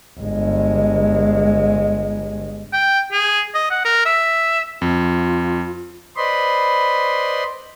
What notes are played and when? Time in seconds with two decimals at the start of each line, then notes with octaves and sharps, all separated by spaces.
0.19 G1 G#3
2.73 G5
3.12 G#4
3.54 D#5
3.71 F#5
3.85 A#4
4.06 E5
4.82 F2 F4
6.17 B4 C5 D5 D#5 B5 C6